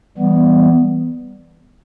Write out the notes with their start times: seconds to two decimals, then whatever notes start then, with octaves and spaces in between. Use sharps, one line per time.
0.18 E3 G3 B3